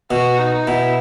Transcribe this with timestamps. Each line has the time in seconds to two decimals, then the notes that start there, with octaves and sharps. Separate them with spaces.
0.11 B2 F#4
0.38 D#4
0.67 B2 E4